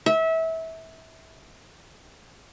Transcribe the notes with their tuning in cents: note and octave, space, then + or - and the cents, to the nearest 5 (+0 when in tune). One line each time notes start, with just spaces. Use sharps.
E5 -25